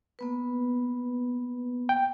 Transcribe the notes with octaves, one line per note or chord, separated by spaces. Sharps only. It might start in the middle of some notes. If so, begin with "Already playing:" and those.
A#3 B3 B4
G5